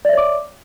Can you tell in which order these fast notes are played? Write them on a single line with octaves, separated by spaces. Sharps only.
D5 E5 C#5 D6